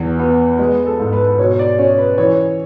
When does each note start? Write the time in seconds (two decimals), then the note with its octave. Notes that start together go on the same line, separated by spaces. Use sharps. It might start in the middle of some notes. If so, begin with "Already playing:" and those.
Already playing: E2 E3
0.19 B3
0.59 G#3 B4
0.86 A4
1.00 G#2
1.13 B4
1.28 B4
1.38 B2 C#5
1.59 D5
1.79 C#4 C#5
1.98 B4
2.18 E3 C#5